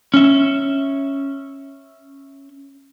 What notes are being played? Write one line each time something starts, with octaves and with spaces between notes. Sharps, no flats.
C#4 E5